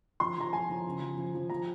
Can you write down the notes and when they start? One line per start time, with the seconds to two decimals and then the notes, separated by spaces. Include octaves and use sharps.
0.20 F3 C6
0.37 F3 A#5
0.53 F3 G#5
0.69 F3
0.86 C#3
1.01 F3
1.17 F3
1.34 F3
1.50 F3 A#5